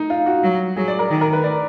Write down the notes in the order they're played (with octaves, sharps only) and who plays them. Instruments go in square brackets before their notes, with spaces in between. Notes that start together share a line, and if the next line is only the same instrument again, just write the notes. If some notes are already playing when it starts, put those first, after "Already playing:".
Already playing: [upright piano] D#4
F4
F#4
[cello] F#3
[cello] F#3 [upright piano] G#4
[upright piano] D5
A#4
[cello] D#3
[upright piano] A#4
B4
D5